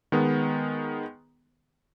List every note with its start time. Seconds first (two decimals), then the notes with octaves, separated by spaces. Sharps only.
0.12 D#3 G#3 B3